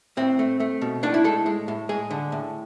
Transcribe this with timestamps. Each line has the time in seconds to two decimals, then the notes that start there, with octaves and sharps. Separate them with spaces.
0.17 A2 C4
0.39 A3
0.60 A3
0.81 B2
1.03 A2 D4
1.14 E4
1.24 G#3 A4
1.46 G#3
1.68 A2
1.89 G#3 G#4
2.11 D3
2.32 A2